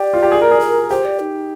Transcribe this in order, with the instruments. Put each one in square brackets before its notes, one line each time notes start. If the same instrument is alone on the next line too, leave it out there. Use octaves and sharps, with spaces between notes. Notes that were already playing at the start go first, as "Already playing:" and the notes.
Already playing: [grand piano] G4 [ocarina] D5
[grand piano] F4
G4
G#4
A#4
G#4
[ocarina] A#4
[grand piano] G4 [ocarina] C5
[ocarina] D5
D#4